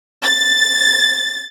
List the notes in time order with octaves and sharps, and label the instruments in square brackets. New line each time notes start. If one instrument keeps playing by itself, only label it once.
[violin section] A6